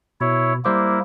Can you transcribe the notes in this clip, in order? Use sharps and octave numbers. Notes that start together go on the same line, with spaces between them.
B2 E4 C#5
G3 A#3 E4 C5 D6